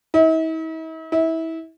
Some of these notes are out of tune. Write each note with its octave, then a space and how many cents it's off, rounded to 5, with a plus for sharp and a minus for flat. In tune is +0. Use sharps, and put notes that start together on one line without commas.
E4 -45
E4 -25